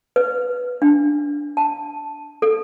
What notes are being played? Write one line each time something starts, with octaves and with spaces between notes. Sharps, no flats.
B4
D4
A5
A4